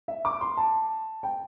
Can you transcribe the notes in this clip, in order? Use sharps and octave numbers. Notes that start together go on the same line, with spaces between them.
E5
D6
C6
A5
G5